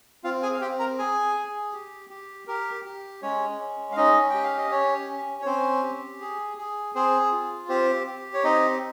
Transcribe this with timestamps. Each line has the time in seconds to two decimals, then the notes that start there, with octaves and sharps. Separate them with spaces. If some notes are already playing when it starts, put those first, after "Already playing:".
0.24 C4 F4 F5
0.42 G#4 G#5
0.53 F5
0.61 C4 G4 G5
0.79 A#4 A#5
0.98 G#4 G#5
1.36 G#4
1.73 G4
2.10 G4
2.47 G4 A#4
2.85 G4
3.22 G#3 C#4 C#5
3.60 C#4
3.92 F5
3.96 C#4 D#4 D#5
4.30 G4 G5
4.43 F5
4.58 D#5
4.71 C#4 C#5
5.09 C#4
5.42 C#5
5.46 C4 C#4 C5
5.83 G4
6.21 G#4
6.57 G#4
6.95 C4 G#4 C5
7.32 F4
7.69 C4 G4 C5
8.07 G4
8.34 C#5
8.44 C4 D#4 D#5